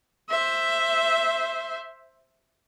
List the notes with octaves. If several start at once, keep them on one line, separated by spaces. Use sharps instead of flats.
C5 E5